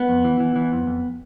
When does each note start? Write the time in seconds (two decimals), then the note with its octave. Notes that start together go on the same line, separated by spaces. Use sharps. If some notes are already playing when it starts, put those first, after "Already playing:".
Already playing: B3
0.09 F2
0.25 E3
0.40 E3
0.56 E3
0.72 F2
0.87 F2